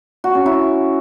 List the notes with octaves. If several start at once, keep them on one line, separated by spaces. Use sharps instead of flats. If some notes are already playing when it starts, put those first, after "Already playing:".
F#4
C#4
E4